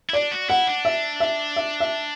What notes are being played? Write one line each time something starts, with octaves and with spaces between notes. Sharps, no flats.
E4
D4 D5
F#4
E4 F#5
D4
E5
E5
E5
E5